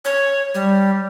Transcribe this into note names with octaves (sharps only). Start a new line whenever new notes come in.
C#5
G3